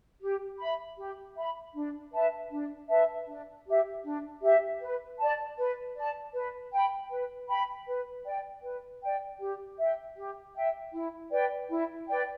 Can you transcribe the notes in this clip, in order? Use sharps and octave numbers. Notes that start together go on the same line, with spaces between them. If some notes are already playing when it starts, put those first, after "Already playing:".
G4
E5 B5
G4
E5 B5
D4
B4 E5 A5
D4
B4 E5 A5
D4
G4 E5
D4
G4 E5
B4
D5 A5
B4
D5 A5
B4
G5 B5
B4
G5 B5
B4
D5 G5
B4
D5 G5
G4
E5 G5
G4
E5 G5
E4
B4 D5 G5
E4
B4 D5 G5